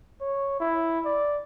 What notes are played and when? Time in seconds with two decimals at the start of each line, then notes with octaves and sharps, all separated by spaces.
0.21 C#5
0.60 E4
1.05 D5